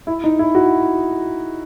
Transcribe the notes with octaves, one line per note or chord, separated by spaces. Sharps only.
E4
D#4
E4
F#4